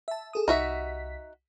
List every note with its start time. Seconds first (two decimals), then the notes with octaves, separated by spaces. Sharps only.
0.08 E5 A5
0.33 G#4 A4 D#6
0.48 C2 D#4 F#4 E5 B6